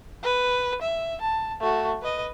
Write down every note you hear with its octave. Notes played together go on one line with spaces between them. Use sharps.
B4
E5
A5
A3 F#4
B4 D#5